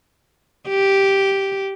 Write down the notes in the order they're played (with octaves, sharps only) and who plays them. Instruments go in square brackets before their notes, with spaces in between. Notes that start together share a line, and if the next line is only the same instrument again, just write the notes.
[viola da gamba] G4